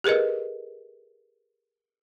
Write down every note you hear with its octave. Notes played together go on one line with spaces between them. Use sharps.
G4 G#4 A#4 B4 D#5